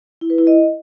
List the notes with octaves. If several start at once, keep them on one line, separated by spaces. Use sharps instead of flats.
E4
B4
E4
D#5